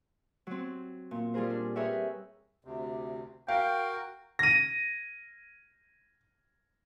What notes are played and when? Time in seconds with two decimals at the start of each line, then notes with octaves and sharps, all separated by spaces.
0.47 F#3 C4
1.11 A#2
1.34 G3 F4 G#4 A#4 C5
1.50 D4
1.76 G#4 A#4 B4 C#5 E5 G5
2.65 D2 C3
3.48 F#4 A#4 F5 G5
4.39 A#6 D#7